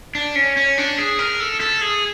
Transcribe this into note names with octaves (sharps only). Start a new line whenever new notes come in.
D4
C#4
C#4
D4
G#4
A#4
A4
A4
G#4